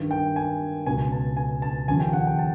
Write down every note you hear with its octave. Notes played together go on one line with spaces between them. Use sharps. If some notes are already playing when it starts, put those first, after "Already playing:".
Already playing: G2 D#3
G5
G#5
C#2 B2 G#5
A5
G#5
A5
D#2 C#3 F3 G#5
G5
F#5
G5
A5